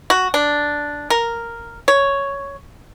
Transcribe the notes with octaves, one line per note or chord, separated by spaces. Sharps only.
F#4
D4
A#4
C#5